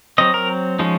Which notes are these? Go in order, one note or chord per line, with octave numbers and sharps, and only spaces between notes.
F#3 C4 D#5
A#4
F3 G#3 C#4 D#4